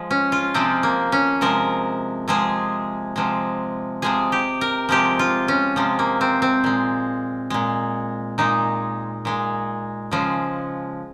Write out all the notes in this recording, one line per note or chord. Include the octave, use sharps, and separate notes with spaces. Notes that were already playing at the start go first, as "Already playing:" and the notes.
Already playing: F3 G#3
C#4
F4
C3 F3 G#3 C4
A#3
C#4
C3 F3 G#3 A#4
C3 F3 G#3 G#4
C3 F3 G#3
C3 F3 G#3 G#4
G4
A#4
C3 F3 G#3 G4
F4
C#4
C3 F3 G#3
A#3
C4
C4
A#2 G#3
A#2 G#3
A#2 G#3 D#4
A#2 G#3
C#3 F3 G#3